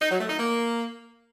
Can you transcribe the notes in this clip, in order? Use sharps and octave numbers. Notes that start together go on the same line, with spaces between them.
D#4
F#3
A3
D#4
A#3